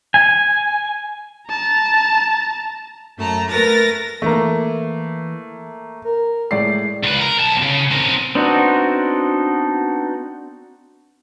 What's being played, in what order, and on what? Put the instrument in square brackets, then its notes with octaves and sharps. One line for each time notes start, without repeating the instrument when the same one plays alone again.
[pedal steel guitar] G#5
[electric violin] A5 A#5
[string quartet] F#2 A3 A5 A#5
A3 A#4 B4 A6 A#6
[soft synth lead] E3 [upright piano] A3 A#3
[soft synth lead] A#4
[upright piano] A2 D5 C7 [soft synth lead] G#3
[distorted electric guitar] C#2 B4
A#4
B1 A5
C#3
C4 A#4
[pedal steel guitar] B3 C4 D4 D#4 F#4